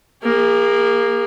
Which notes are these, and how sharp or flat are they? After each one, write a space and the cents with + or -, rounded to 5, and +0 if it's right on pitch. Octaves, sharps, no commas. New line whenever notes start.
A#3 +0 G#4 -40